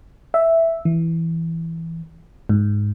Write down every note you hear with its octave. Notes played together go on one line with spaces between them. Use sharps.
E5
E3
G#2